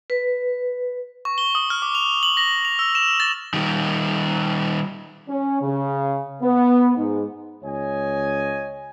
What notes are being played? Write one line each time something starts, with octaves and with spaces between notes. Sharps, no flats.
B4
C#6
G7
D#6
F6
D6
F7
F#7
A#6
F7
E6
E7
A6
D#3 G3
C#4
C#3
B3
G#2
C#2 C#5 D#5 G#5